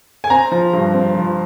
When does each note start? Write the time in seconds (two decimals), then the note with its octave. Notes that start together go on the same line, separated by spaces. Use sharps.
0.24 G#5
0.30 C4 A#5
0.52 F3
0.73 G2
0.94 C4
1.15 F3